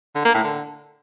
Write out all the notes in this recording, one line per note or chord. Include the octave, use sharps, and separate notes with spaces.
D3
A#3
A2
D3